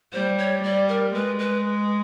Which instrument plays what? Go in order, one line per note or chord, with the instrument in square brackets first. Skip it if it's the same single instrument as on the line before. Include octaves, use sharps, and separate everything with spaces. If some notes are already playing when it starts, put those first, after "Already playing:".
[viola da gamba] G3 [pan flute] C5
[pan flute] C#5
[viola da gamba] G3 [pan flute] D5
[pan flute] A#4
[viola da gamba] G#3 [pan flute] B4
[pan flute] B4